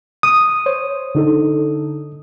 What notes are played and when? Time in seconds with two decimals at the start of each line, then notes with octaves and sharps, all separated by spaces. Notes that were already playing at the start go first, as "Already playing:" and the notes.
0.23 D#6
0.66 C5 C#5
1.15 D3 D#4 A4